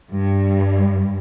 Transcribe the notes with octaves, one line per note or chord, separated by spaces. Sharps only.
G2